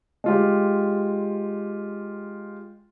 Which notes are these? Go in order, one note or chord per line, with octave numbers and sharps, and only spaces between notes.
G#3 F4 G4